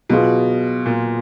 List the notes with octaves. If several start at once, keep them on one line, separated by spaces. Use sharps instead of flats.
B2 F#3 B3 F4 G#4
A#2